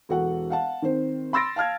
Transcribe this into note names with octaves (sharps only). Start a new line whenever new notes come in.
E1 F#4 A4 F#5
F5 F#5 A5
D#3 C4 C5
B5 C6 E6 A6 A#6 D7
F5 A5 F6 G#6